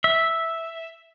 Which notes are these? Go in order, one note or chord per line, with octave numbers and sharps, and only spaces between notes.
E5